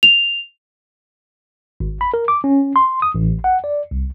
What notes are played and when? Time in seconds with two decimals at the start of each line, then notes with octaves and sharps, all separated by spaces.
0.03 F7
1.80 G#1
2.01 B5
2.14 A#4
2.28 D6
2.44 C#4
2.76 C6
3.02 D#6
3.15 A1
3.44 F#5
3.64 D5
3.91 C2